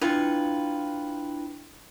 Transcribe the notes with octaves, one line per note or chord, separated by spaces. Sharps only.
D4 E4 F4 B4 G5